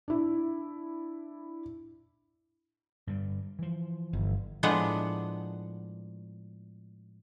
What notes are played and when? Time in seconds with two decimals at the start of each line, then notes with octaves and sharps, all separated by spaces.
0.08 D4 E4
3.07 G2 D3 G3
3.59 E3 F3
4.13 G1
4.63 A2 F3 G#3 B3 D4 F#5